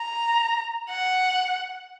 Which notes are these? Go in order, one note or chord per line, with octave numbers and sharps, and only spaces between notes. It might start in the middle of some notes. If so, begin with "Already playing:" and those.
Already playing: A#5
F#5